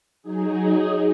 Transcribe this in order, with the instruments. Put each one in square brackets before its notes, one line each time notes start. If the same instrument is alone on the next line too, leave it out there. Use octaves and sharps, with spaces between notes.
[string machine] F#3 D#4 G#4